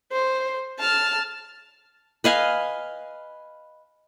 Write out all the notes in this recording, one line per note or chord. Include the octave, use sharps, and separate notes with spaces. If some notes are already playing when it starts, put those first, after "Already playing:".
C5
A5 F6
B4 D#5 F5 G#5